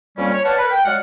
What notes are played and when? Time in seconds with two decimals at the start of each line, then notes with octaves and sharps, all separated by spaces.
0.18 F2 G3 A#3 C#4
0.33 C#5
0.44 B4 C#5 D5 F5 F#5 A5
0.58 A#4 B4
0.71 G5
0.86 F#3 G#3 D5 F5 F#5